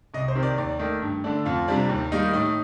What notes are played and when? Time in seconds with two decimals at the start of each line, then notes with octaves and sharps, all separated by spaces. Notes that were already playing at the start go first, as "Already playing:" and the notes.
0.14 C2 D#5
0.28 C5
0.35 C3 D#3
0.43 D5
0.58 D#2 D5
0.79 D#3 A3
1.02 G2
1.24 D3 A3 D4
1.45 F2 F4
1.68 C3 G3 D4
1.89 D#2
2.12 D#3 G3 A#3 D#4
2.33 A2 D#4